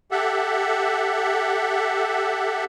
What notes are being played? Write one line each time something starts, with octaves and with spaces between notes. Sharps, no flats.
G4 A4 E5 F#5